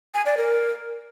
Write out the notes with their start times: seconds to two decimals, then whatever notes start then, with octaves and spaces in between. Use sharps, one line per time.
0.14 G#5
0.26 D5
0.37 A#4